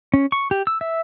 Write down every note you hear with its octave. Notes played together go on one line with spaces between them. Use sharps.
C#4
C#6
G4
E6
E5